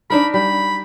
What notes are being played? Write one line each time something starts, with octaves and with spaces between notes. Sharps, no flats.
D4 D#4 A#4 B5
G3 B5